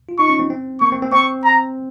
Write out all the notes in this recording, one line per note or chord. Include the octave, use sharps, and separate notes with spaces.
F4
D#4 C#6
C#4
C4
C4
A#3 C#6
C4
C4
C4 C#6
A#5